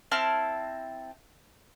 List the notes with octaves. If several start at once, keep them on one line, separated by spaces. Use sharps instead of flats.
C4 E4 A5 F6